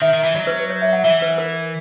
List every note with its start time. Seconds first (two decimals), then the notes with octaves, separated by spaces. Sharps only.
0.02 D#3 E5
0.14 D#3
0.24 E3
0.35 F#3 D#5
0.47 B4
0.60 B4
0.70 C#5
0.82 E5
0.93 F#5
1.04 E3 E5
1.22 B4
1.38 A#4